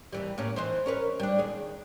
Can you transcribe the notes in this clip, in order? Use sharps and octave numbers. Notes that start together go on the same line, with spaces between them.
D#2 E3 G3
A2 A#3 C#4
E3 D#4 C5
C#4 A#4 B4
G3 D4
D#2 G#4